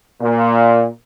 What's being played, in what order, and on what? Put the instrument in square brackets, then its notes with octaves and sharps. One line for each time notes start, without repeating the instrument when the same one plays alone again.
[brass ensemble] A#2